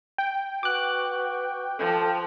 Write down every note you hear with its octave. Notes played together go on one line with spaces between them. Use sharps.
G5
F#4 B4 C#6 D6 F#6
F3 A4